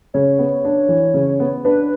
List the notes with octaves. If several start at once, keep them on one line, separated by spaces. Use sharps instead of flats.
C#3 C#5
B3
D4
E3
C#3
B3
D4 B4